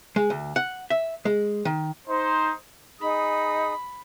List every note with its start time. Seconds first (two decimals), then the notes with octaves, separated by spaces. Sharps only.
0.16 G#3
0.30 D2
0.56 F#5
0.90 E5
1.25 G#3
1.65 D#3
2.08 D#4 C5
3.00 D#4 G#4 B5 D#6